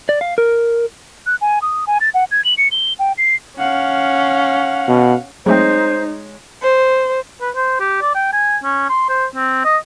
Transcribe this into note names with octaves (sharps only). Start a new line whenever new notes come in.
D5
F5
A#4
F#6
G#5
D#6
G#5
A6
F#5
G#6
F#7
C#7
G7
G5
C7
C#4 F5 F#5
B2
F#3 G#3 A3 C4 D#4 C5 C#5
C5
B4
C5
G4
D5
G5
G#5
C#4
C6
C5
C4
D#5